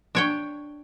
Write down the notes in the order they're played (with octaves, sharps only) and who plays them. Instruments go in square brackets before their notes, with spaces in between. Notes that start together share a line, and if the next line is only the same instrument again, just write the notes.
[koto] D4 C#5 G5